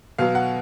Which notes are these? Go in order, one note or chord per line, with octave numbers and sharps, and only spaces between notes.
B2 F#3 B3 F5
F#5